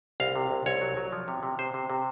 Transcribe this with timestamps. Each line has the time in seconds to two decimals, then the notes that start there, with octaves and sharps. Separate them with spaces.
0.20 C2 F5
0.36 C3
0.51 C2
0.66 C2 C#5
0.81 F#3
0.97 F#3
1.12 F3
1.28 C3
1.43 C3
1.59 C3 C5
1.74 C3
1.90 C3